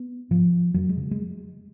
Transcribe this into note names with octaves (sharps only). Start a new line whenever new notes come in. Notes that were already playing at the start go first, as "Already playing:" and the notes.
Already playing: B3
G#2 F3
F2 F#3
G#3
C#3
G#3